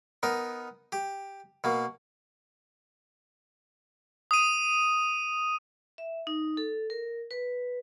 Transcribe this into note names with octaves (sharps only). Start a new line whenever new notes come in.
B3 D#4 A#4
G4
B2 A#3
D#6 D#7
E5
D#4
A4
A#4
B4